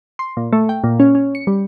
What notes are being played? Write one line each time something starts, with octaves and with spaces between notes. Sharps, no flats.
C6
A#2
A3
G5
A#2
C#4
C#4
C#7
G3